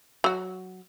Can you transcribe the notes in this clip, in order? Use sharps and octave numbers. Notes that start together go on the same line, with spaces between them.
F#3 F#4